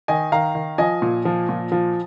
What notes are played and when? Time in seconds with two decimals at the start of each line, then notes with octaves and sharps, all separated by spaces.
0.08 D#3 D#5 G#5
0.32 D#3 F5 A#5
0.55 D#3
0.78 F3 D#5 G#5
1.02 A#2
1.25 F3
1.49 A#2
1.72 F3